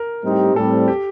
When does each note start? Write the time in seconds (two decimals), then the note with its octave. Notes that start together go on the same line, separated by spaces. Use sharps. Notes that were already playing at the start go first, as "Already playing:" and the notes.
Already playing: A#4
0.23 A2 G3 C4 D#4 G4
0.55 A2 G3 C4 A4
0.88 G4